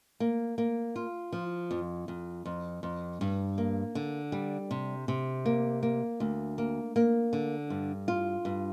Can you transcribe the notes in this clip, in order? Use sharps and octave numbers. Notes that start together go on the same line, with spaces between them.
A#3
A#3
F4
F3
F2
F2
F2
F2
G2
A#3
D3
G3
C3
C3
A#3
A#3
D2
A#3
A#3
D3
G2
F4
G2